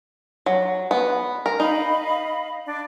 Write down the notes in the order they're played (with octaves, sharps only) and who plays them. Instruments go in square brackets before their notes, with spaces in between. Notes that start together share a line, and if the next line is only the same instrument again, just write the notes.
[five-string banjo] F#3
B3
A#4
[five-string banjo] D#4 [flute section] D#5 F5 B5
[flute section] D4 D5